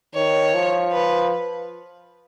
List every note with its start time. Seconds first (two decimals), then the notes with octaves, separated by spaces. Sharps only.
0.14 D#3 C#5
0.54 F3
0.92 B4